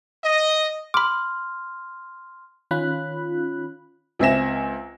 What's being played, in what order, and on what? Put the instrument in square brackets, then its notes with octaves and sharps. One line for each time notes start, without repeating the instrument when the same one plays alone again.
[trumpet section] D#5
[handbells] B5 D6 [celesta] C6 F6
[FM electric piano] D#3 C#4 F4 B5 F#6
[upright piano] C#2 C4 E5 G#5 A#6 E7